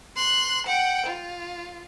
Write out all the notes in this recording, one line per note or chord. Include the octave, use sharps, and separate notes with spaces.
C6 F#6
F#5 G5
F4